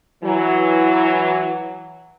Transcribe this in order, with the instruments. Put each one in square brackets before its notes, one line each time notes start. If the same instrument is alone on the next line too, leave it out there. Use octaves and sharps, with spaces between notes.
[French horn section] E3 F#3